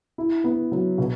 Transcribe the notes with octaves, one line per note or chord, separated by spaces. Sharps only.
E4
B3
F#3
B2